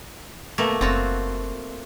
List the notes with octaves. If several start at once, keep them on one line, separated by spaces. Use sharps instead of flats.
B2 A3 A#3
F#1 C4 F4 F#4